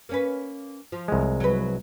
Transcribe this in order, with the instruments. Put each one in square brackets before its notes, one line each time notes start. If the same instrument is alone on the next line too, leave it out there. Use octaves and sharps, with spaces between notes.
[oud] A#3 C#4 B4
F3
[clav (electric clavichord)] C2 G#3
[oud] F#3 B4